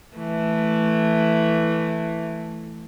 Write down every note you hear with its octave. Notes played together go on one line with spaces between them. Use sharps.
E3 A3